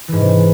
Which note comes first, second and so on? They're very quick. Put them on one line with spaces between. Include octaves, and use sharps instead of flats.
E3 G#2 C3